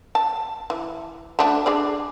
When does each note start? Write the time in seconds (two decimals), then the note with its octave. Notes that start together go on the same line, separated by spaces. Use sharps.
0.15 A5
0.70 E3
1.39 A3 D4 F#4
1.66 D4 G#4 D5